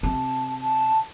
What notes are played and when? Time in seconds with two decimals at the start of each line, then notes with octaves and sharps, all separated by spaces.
0.03 C3 A5
0.61 A5